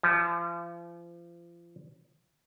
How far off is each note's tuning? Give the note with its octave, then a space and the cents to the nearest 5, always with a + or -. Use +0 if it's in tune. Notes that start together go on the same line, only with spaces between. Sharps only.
F3 -35